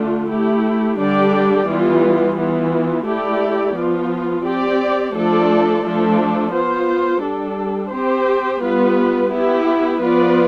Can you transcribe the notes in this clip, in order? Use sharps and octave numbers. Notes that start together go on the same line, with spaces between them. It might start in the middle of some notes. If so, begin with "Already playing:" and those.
Already playing: D3 A3 D4 F4
A3 E4 G4
D3 G3 D4 G4 D5
E3 G3 B3 F4
E3 B3 F4
A3 E4 G4 D5
F3 B3 F4
C4 G4 D5
F3 A3 D4 A4 D5
F3 A3 D4 A4
B3 F4 C5
G3 D4 A4
C4 G4 C5
G3 B3 F4 B4
B3 E4 G4
F3 B3 F4 B4 D5